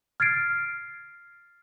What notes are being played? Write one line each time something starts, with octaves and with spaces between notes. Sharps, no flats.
F6 G#6 A6 C7 D7